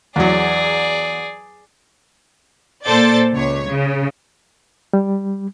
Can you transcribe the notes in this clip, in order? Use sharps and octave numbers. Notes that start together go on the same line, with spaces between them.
E2 F#3 G#4 D5
A#2 A4 C5 D5 A6
C#2 C#5
C#3
G3